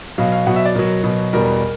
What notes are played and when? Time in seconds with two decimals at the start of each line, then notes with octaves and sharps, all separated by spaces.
0.18 B2 F#3 F5
0.32 F5
0.47 B2 F#3 F#5
0.56 E5
0.65 D5
0.75 B2 F#3 A#4
1.04 B2 F#3
1.33 E2 B2 G3 A#4